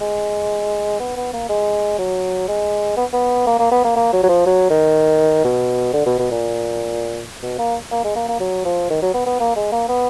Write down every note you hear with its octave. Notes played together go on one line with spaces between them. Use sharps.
G#3
B3
B3
A#3
G#3
F#3
G#3
B3
B3
A#3
A#3
B3
A#3
A#3
F#3
F#3
F3
F#3
D#3
B2
D3
B2
B2
A#2
B2
A#3
A#3
G#3
A#3
A#3
F#3
F3
D#3
F#3
B3
B3
A#3
G#3
A#3
B3